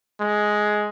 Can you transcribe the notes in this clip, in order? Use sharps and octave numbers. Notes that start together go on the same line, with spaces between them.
G#3